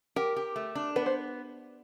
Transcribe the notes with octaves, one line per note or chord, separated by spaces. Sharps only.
G4 A#4
G4
A3
D4
B3 B4
C5